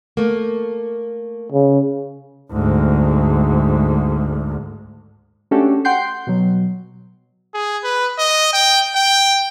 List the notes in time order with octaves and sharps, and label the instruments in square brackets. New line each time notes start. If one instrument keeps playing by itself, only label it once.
[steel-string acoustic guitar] A3 A#3
[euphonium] C#3
[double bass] D2 G#2
[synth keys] A3 C#4 D4 F#4 G4 A4
F#5 G5 C6 G6 C7
B2 F#3
[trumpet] G#4
B4
D#5
G5
G5